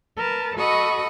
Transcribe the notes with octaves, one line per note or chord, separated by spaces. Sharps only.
A#4 B4 A5
F#4 A4 D#5 B5 C#6 D#6